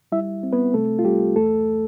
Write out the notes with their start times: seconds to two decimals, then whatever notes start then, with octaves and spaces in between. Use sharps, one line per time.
0.12 G3 E4 E5
0.43 C4
0.53 B3 B4
0.74 C3 A3 A4
0.99 F4
1.04 C2 G3 G4
1.36 E2 A3 A4